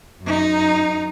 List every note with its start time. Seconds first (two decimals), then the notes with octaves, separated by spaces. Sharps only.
0.22 F#2 D#4